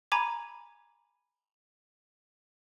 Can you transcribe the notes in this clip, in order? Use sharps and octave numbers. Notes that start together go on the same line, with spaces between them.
G#5 A#5 B5 D6 G#6